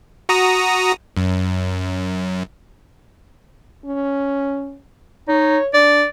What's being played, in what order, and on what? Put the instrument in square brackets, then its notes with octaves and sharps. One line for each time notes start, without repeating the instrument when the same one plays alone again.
[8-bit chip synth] F#4 A#5 D#6
F#2
[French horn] C#4
[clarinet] D#4 [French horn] C#5
[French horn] D4 [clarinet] D5